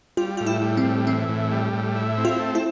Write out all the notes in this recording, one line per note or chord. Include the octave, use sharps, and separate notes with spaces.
G3 F4
A2 F4
E4
G3
C4
A2
E3 C4
A2
G3
A2
E4
C4
F4
A3
E4